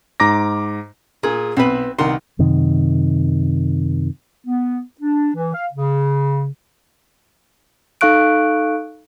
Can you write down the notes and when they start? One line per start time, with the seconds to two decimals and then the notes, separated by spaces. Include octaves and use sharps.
0.20 G#2 A#5 D6 A#6
1.23 A#2 G#4
1.57 B1 C4 B4 B5
1.99 C2 D#3 F#5 C6
2.39 F#2 C3 D#3
4.46 B3
5.01 D4
5.34 E3
5.54 F5
5.73 C#3
8.01 D#4 A4 F5 C#6 F#6 D7